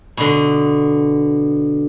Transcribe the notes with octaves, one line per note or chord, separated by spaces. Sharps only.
B2 D3